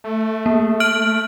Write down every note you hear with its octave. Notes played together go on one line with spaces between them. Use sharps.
A3
A#3
F6 D7 F#7